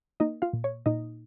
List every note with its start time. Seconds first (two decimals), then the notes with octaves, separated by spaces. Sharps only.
0.20 A#3 D#4 D#5
0.42 F4 F5
0.53 A#2
0.64 C#5
0.86 A#2 D#4 D#5